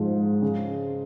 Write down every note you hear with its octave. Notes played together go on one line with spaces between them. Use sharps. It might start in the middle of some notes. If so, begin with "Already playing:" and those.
Already playing: G#2 F3 G#3
C#3